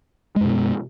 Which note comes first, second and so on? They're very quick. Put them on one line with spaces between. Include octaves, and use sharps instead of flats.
G#3 F#2 B2 B3